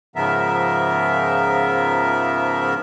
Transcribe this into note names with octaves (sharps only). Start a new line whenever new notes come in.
G#2 C#3 F3 B3 A#4 E5